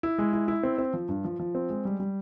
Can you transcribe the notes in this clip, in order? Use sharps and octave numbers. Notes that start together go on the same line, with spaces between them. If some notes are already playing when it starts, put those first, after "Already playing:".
E4
G#3
E4
E4
C4
C4
F3
G2
F3
F3
C4
G#3
G3
G3